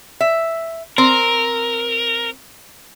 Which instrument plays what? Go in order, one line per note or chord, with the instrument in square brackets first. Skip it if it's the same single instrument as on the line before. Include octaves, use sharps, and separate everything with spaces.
[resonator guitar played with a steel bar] E5
[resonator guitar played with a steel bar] C4 [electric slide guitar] A#4